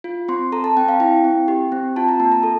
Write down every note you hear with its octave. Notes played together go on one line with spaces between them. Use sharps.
F4
C4 C6
A4 A#5
A5
C4 G5
F5
E4 G5
C4
G4
C4
F4 A5
A#5
A#3 A5
A#5
A4